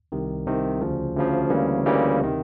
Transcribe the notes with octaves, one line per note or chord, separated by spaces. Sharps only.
C2 C3 D#3
C2 C3 D#3
D2 C#3 F3
D2 C#3 F3
D2 C#3 E3 G3 A#3
D2 C#3 E3 G3 A#3
C3 D#3